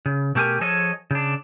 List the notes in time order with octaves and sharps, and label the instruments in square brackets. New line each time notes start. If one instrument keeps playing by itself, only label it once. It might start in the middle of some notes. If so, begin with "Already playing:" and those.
[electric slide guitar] C#3
B2 A3 G4 A#4 G#5
F3 G#4 A4 C#5 D#5
C#3 D4